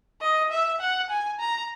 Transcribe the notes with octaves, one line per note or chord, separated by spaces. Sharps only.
D#5
E5
F#5
G#5
A#5